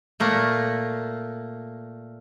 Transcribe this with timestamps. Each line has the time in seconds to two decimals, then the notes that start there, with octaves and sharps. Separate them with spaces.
0.20 A#2 A3 A#3